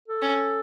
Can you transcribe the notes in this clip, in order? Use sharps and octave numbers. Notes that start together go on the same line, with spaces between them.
A4
C#4